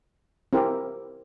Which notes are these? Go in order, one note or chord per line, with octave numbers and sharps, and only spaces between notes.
C4 E4 G4 A#4